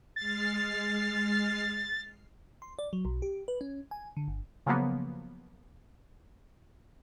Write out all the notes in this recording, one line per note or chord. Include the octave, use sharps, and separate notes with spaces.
G#3 F6 A6 C7
C6
D5
F#3
B1
G4
B4
C#4
G#5
D3
G1
C#3 F3 F#3 A#3 B3